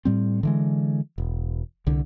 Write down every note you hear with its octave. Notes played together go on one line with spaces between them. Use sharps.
A2 G3 C4
D3 E3 G#3
E1
C2 D3